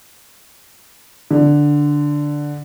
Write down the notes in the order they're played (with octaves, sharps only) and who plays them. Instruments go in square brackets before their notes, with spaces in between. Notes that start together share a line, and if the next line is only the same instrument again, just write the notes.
[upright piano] D3